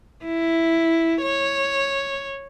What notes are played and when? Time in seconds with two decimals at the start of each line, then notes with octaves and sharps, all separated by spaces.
0.25 E4
1.22 C#5